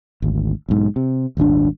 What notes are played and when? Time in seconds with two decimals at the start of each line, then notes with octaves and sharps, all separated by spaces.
0.22 G#1 D2
0.69 B1 G#2
0.96 C3
1.37 D#1 G#1 C#4 D4